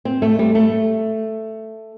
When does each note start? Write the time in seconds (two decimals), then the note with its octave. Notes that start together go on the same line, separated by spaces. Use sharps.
0.05 C4
0.22 A3
0.39 G3
0.55 A3